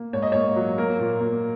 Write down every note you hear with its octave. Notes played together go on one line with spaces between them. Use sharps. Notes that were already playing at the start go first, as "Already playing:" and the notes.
Already playing: A#3
G#2 C#5
D#5
A#3 C#5
F#3
A#3 A#4
A#2
A#3